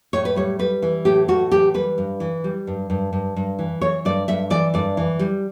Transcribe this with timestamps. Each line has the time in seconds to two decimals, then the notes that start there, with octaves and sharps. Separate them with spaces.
0.13 A2 C#5
0.25 B4
0.36 G3 C#5
0.59 G3 B4
0.82 E3
1.05 A2 G4
1.28 A2 F#4
1.51 E3 G4
1.74 G3 B4
1.98 G2
2.20 E3
2.44 G3
2.67 G2
2.90 G2
3.13 G2
3.36 G2
3.59 E3
3.81 E3 C#5
4.05 G2 D5
4.28 G2 E5
4.50 E3 D5
4.74 G2 D5
4.97 E3
5.19 G3